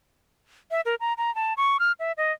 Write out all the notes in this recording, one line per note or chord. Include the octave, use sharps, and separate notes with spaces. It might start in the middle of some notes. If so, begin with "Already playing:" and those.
E5
A#4
A#5
A#5
A5
C#6
F6
E5
D#5